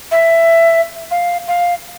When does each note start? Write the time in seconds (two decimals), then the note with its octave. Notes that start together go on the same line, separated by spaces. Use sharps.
0.11 E5
1.11 F5
1.48 F5